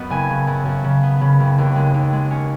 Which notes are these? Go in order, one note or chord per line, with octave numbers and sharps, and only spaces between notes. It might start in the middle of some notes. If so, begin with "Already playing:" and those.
Already playing: F#2 B3 D#5
F#1 G#5
C#3
F#2
F#2
C#3
B3
C#3
F#1
D#2
G#3
D#2
G#3
C#4